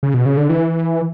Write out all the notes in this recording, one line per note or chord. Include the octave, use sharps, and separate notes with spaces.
C#3
B2
C#3
D3
E3